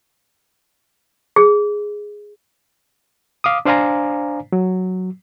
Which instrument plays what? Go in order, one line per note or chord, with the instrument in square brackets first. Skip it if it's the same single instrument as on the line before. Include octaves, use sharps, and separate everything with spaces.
[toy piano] G#4
[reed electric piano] F5 D6 D#6
D4 C5 D5 F5 G#5 A#5
F#3